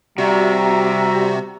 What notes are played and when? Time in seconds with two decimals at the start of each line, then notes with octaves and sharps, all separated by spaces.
0.18 C3 G3 F#4 D5 E5 A#5